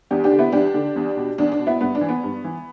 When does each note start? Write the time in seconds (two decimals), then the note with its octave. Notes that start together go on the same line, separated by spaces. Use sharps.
0.11 E2 D4 G4
0.24 D4 G4
0.31 D3
0.39 B3 E4
0.52 E2 D4 G4
0.74 D3
0.96 E2
1.17 B2
1.38 E2 D4
1.52 D4
1.59 B2
1.67 B3 E4
1.81 G2 B3
1.95 D4
2.01 E3
2.09 B3
2.23 G2
2.44 E3